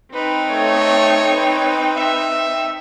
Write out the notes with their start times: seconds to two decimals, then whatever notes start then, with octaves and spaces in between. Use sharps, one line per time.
0.14 C4 D#4 B4 G5
0.50 A3 C#5
1.33 B4
1.96 E5